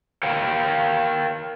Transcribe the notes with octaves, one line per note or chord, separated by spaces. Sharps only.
A#4 C#5 F5 G5